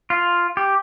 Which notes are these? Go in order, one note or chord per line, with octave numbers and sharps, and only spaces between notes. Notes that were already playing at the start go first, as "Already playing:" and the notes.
F4
G4